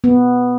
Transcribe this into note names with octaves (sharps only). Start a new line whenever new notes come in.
B3